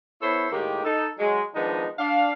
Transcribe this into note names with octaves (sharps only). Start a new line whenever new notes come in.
B3 E4 A4 C5 C#5 B5
A2 D#3 G#3 A#3 G4
D#4 A4
F#3 G#3
D#3 F3 G#3 B3 D4 D#4
D4 F5